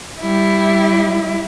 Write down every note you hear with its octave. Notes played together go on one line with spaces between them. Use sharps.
G3 E4